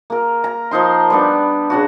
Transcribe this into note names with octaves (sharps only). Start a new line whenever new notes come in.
A#3 A#4
A#5
F3 A#3 D#4 C6
G3 B3 D4
C#3 D4 F#4